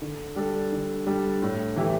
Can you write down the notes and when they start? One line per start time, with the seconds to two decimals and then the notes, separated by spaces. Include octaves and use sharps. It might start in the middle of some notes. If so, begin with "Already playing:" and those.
0.02 D3
0.36 G3 D4 A4
0.72 D3
1.07 G3 D4 A4
1.42 A2
1.76 E3 A3 E4 G4